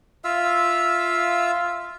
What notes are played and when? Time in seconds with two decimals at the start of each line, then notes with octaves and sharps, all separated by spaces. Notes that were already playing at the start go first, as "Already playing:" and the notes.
0.24 F4 E5 F5 E6